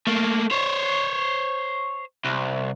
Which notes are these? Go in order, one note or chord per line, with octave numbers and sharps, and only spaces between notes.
A3 A#3
C5 C#5
C2